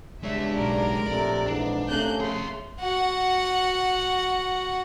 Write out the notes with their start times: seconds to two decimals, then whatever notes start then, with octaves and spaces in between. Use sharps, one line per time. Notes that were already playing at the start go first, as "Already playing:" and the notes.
0.23 E2 G2 G#3 D4 C#5 E5
0.57 B1 A#4 D7
1.06 A#1 A2 C3 A3 D5
1.47 F2 G#2 E3 D4
1.89 C3 A3 A#3 C#4 F#6 G6
2.20 G#4 E5 C6
2.81 F#4 F#5